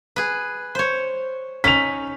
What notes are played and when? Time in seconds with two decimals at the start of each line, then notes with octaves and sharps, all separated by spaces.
0.16 G#4 B4
0.75 C5 C#5
1.64 C#4 D#4 B6 F7